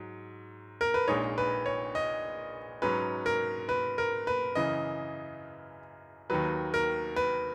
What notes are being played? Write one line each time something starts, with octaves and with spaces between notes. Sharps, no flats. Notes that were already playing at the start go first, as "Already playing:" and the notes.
Already playing: G#2 F#3
A#4
B4
A#1 A#2 G#3 D#4 C#5
B4
C#5
D#5
G#2 F#3 C#4 B4
A#4
B4
A#4
B4
F#2 C#3 E3 D#5
D#2 D#3 F#3 B4
A#4
B4